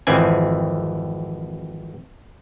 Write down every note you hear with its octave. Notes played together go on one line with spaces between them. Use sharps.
G#1 F2 E3 C4 G#5